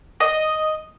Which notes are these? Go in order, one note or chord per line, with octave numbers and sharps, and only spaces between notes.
D#5